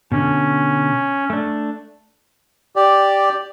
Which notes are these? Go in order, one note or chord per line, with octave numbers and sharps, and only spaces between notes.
B2 D3 C#4
A3 D4
G4 D5